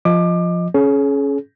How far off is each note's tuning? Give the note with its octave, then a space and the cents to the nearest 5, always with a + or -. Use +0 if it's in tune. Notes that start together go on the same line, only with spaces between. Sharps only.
F3 +0 D#5 +0 D6 +25
C#4 +0 G#4 +35